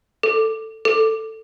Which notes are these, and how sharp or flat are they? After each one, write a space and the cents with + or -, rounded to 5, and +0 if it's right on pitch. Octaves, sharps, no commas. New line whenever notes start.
A4 +10
A4 +10